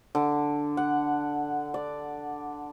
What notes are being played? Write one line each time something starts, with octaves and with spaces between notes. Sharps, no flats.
D3
F#5
D5